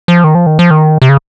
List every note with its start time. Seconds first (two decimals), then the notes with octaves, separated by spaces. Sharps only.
0.08 F3
0.24 D#3
0.35 F3
0.46 D#3
0.59 F3
0.71 D#3
1.02 C3
1.09 C#3